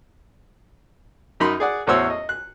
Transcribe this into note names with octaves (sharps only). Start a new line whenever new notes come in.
F#2 D#4 A#4 B5 C6
G#4 D5 F#5
A1 E2 F#4 C5 C#5 E6
D#5
F#6